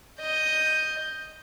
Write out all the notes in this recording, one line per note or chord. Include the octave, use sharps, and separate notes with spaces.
D#5 G6